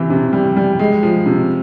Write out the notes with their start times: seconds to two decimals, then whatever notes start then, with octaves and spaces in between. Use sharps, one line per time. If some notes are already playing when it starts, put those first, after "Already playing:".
Already playing: C3 E3
0.10 C3
0.33 G3
0.56 G3
0.79 G#3
1.03 F3
1.26 C3